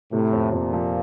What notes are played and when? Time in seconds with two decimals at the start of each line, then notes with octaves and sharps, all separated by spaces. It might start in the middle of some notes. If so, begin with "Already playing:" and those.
0.13 A2 C3
0.33 F2
0.52 F2 A#2
0.73 F3